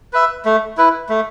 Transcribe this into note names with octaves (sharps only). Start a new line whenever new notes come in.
B4 E5
A3
E4 B4
A3